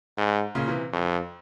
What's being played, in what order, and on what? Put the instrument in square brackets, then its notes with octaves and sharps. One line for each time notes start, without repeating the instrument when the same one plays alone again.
[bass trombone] G#2
[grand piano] A#2 C#3
C3 E3
[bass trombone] F2